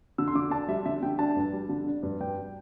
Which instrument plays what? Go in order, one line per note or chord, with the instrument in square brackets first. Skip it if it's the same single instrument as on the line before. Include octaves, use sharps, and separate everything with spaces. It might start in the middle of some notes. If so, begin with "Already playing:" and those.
[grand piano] D3 E6
C6
D3 D6
D4 A5
G3 E5
D3 E5
D3 G5
D4 A5
G2
G3
D3
D4
G2
G2 G5